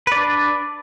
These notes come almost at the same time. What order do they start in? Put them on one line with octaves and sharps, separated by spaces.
B4 D5 D4